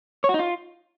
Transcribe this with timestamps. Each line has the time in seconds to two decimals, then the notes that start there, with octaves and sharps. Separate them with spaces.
0.24 C#5
0.29 F#4
0.34 D#4
0.39 F4